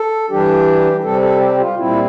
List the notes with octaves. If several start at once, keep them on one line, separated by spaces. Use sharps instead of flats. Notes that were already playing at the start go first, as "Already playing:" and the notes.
Already playing: A4
E3 G3 D4 G4
C3 G3 C4 A4
A4
G4
F4
A#2 G3 C4 E4